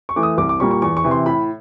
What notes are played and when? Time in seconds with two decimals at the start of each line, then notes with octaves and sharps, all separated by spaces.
0.09 C#6
0.16 E3 A3 D6
0.23 D#6
0.38 C2 D6
0.49 D6
0.60 A#2 G3 A#3 C#6
0.71 C#6
0.82 E2 C#6
0.97 C#6
1.04 C3 E3
1.11 C6
1.26 A2 B5